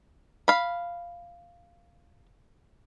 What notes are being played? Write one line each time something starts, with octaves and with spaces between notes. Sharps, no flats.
F5 B5